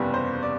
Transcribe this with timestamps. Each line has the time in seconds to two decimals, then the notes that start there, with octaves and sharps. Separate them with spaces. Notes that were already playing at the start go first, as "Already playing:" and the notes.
Already playing: F#1 E2 C3 G3 B3
0.14 C5
0.43 D5